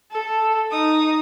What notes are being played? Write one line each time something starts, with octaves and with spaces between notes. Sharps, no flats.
A4
D#4 D#6